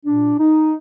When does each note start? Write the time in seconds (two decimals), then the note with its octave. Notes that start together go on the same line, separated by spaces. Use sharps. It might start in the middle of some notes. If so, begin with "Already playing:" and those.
0.06 A#2 D4
0.39 D#4